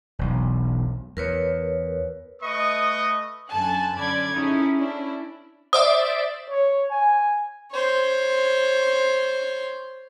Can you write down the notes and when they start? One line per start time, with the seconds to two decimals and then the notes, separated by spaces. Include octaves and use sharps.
0.19 E1 B1
1.17 E2 A#4 B4 C#5
2.42 A3 B4 D#5 C#6 D#6
3.50 F#2 D3 A4 G#5 A5 F#6
3.94 F#2 D3 C#4 D5 B5 G#6
4.33 C#4 D#4 E4 G#4 A4
4.76 C#4 D4 E4
5.73 C5 D5 E5 D#6
6.50 C#5
6.91 G#5
7.71 C5 C#5